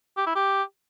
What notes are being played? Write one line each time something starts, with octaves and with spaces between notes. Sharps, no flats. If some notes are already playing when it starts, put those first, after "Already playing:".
G4
E4
G4